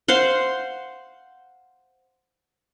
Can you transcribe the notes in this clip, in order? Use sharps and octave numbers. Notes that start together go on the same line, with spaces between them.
C5 F5 F#5 C6